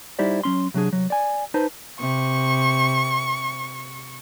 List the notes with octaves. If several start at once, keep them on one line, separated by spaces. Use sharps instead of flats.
G3 D#4 E4 G4 C5 D5
F#3 C#4 C6
C3 F#3 D4 G#4
C2 F#3
D5 G#5
D#4 B4 C5 A5
C3 C#6